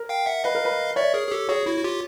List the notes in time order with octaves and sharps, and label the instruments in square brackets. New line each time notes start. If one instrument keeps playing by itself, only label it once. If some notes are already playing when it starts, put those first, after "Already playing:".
Already playing: [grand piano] A#4
[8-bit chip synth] F5 G5
E5 F#5
[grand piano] B4 [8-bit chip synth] D#5 F5
[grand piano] A#4
B4
[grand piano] C#5 [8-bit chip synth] D5 E5
[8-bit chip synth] G#4 A#4
G#4
G4 A4
[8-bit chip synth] F#4 G#4 [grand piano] C#5
[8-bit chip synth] E4 F#4
F#4
F4 G4